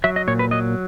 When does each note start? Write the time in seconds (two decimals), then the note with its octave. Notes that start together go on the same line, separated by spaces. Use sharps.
0.04 F#3 E5
0.16 D#5
0.28 A#2 C#5
0.39 B4
0.51 F#3 D#5